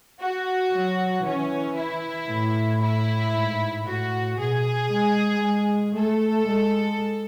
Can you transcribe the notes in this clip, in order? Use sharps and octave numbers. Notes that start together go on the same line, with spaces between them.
F#4
F#3
E3 C#4
E4
A2
E4
G#2
A2 F#4
B2 G#4
G#3
G#3
A3 A4
G#3